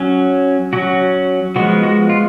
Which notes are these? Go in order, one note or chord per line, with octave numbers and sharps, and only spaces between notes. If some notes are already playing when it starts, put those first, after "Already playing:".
Already playing: F#3 C#4
F#3 C#4 F#4
F3 G#3 B3 F#4
F#4
F4